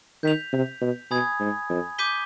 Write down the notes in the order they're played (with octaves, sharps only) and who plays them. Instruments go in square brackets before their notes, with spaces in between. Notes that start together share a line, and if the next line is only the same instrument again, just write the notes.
[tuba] D#3 [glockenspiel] G6 B6 F7
[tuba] C3
B2
[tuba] B2 [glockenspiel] G#5 B5 D#6 G#6
[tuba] G#2
F2
[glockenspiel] D6 G6 B6 D#7 G7